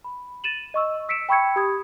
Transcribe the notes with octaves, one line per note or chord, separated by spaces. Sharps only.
B5
A6 D#7 E7 F#7
D#5 C#6 E6
E6 B6 C#7 D7 E7
G5 B5 C#6 E6 G#6 C#7
G4 B5 D#6 G#6